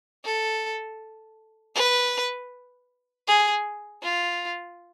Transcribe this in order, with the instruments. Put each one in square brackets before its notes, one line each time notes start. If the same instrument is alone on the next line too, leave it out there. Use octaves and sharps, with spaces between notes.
[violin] A4
B4
G#4
F4